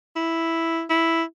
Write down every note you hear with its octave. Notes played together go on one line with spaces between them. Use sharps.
E4
E4